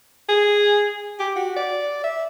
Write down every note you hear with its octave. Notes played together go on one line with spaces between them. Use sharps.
G#4
G4
F#4
D5
E5